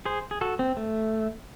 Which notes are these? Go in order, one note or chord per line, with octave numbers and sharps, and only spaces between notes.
G#4 C5
G#4
F#4 A4
C4
A3